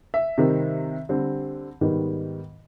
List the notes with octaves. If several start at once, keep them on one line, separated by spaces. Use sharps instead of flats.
E5
C3 D#3 G3 C4
D3 G3 C4
G#2 D#3 G3 B3